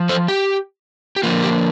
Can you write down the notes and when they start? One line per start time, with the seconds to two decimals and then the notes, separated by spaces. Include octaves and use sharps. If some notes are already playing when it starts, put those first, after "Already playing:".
Already playing: F3
0.09 A4 C5
0.28 G4
1.16 G4
1.23 D3 F3 A#3 F4
1.42 G4